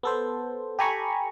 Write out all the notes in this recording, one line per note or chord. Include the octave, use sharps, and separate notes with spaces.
B3 A4 C5
G4 A4 G#5 A#5 B5 C#6